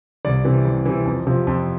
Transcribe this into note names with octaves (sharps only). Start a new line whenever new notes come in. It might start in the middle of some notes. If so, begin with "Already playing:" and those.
C2 D5
C3 E3
C2
C3 E3
F2
C3 F3
F2